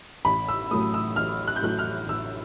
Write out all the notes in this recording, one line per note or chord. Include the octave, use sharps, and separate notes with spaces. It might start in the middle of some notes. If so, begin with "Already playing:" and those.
A1 B5
E6
A2 F#3 A3 D#6
E6
A1 F6
F#6
G6
A2 F#3 A3 F#6
F6
A1 E6